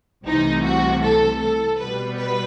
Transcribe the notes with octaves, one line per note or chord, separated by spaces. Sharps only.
C2 C3 E3 A3 D#4
F#4
A4
A4
B2 G3 B3 B4
B4